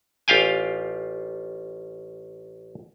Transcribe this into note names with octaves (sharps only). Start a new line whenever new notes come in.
A1 F4 G4 F5 G5 G#5